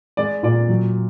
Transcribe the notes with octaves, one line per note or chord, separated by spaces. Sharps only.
G#3 D5
A#2 D5
F#3